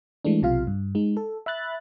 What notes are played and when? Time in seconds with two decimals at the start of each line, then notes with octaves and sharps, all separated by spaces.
0.25 E3 G#3 A3 D4
0.42 B1 C3 F4 F5
0.67 G2
0.95 G#3 D#4
1.17 A4
1.46 E5 B5 F#6 A6